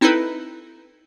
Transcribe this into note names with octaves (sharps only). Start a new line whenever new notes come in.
C4 D#4 E4 A4 B4